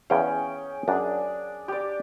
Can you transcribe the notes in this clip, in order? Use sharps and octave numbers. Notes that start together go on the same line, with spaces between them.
E2 C#4 G#4 F5 G5
F#2 D4 G#4
G4 D5